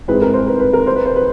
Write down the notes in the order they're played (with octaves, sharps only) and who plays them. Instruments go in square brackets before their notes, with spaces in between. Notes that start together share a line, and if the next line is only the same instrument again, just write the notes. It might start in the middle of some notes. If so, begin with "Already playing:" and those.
[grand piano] G#2 E3 G#3 C4 D#4 [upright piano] B4
[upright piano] A#4
C5
B4
B4
A#4
C5
B4
C5
B4